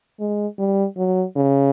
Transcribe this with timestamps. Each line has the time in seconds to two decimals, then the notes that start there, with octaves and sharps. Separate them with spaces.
0.20 G#3
0.58 G3
0.97 F#3
1.36 C#3